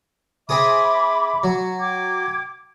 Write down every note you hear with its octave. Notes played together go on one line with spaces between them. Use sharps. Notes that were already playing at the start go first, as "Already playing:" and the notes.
C4 G#4 E5 B5 D6 D#6
F#3
G5 D6 G#6